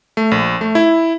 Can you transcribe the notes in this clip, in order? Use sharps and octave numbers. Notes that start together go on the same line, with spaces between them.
A3
A#1
A3
E4